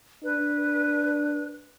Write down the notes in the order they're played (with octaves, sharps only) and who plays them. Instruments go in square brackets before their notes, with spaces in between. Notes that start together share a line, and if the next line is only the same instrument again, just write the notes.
[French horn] D4 [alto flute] B4